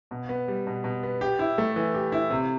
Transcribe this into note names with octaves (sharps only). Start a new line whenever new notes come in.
B2
B3
G3
B2
B2
B3
G4
E4
A3
E3
G4
E4
C3